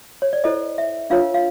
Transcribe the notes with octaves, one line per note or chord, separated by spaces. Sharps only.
C#5
D5
E4 A4 C5 D#5
E5
D4 F4 A#4 C#5 F5
F5